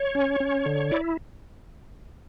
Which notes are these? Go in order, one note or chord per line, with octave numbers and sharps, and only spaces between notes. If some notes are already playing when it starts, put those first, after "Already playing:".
Already playing: C#5
C#4
C#4
D3
E4 D5